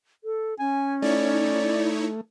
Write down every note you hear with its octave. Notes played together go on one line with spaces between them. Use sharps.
A4
C#4 G#5
A3 D#4 E4 C#5 D5